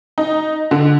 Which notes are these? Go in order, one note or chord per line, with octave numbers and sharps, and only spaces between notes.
D#4
D3